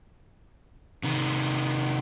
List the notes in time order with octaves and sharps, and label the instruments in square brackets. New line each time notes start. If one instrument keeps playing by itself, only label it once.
[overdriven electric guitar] C3 D#3